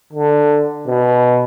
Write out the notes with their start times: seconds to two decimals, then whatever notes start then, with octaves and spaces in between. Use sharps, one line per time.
0.13 D3
0.87 B2